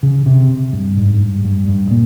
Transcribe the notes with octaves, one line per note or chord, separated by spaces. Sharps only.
C#3
C3
G2
G#2
G2
G2
G2
A#2